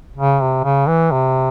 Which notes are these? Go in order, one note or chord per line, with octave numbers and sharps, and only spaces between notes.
C#3
C3
C#3
E3
C3